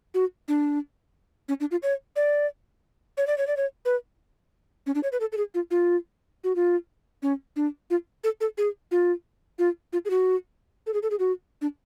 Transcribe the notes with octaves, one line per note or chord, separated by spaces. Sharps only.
F#4
D4
C#4
D4
F4
C#5
D5
C#5
D5
C#5
D5
C#5
B4
C#4
D4
C#5
B4
A4
A4
G#4
F4
F4
F#4
F4
C#4
D4
F4
A4
A4
G#4
F4
F4
F4
G#4
F#4
A4
G#4
A4
G#4
F#4
D4